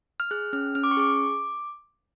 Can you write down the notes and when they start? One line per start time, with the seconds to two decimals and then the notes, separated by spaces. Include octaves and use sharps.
0.20 F6
0.31 G#4 F#6
0.53 C#4 F6
0.75 C#4 F6
0.84 D6
0.91 C#6
0.97 G#4 D6